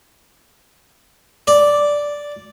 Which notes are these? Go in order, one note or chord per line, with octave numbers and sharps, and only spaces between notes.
D5